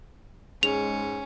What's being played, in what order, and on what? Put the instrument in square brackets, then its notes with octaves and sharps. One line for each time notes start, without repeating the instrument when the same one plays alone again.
[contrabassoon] G#2 [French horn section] G#3 G#4 [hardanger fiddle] C#4 [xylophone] F7